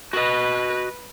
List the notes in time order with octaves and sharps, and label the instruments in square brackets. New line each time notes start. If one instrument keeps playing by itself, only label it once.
[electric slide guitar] F#4 D#5 [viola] B4